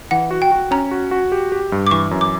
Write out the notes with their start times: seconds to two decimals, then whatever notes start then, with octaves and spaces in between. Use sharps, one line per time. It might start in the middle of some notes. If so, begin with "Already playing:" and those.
0.11 E3 F#5
0.31 F#4
0.42 G5
0.52 F#4
0.71 C#4 A#5
0.91 F#4
1.11 F#4
1.32 G4
1.52 G4
1.72 G2
1.87 D6
1.91 E3 C#6
2.11 F#2
2.21 D6